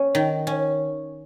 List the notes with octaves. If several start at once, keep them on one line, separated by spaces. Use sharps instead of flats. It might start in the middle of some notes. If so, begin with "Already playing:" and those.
Already playing: C#4
D#3
C#4